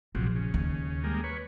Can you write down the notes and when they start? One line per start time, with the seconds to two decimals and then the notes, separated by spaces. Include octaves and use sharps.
0.15 A#1 F2 C3 F#3
0.36 C#3
0.54 D#2
1.04 G3 G#3 A#3
1.24 B4 C#5